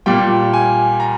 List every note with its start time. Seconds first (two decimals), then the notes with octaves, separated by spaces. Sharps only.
0.06 A#2 G3 G5
0.53 G#5
1.00 A#5